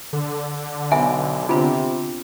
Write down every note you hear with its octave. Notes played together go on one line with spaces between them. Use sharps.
D3
B1 B3 E5 G#5
C3 B3 C4 D4 F4